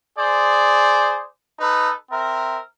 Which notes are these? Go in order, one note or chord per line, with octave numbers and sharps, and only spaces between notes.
G#4 C5 D5
D#4 A4 B4
C4 A#4 E5